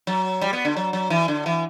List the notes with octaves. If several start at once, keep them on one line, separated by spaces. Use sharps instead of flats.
F#3
G3
B3
D3
F#3
F#3
E3
D3
E3